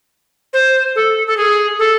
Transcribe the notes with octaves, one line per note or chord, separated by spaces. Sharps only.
C5
A4
A4
G#4
A4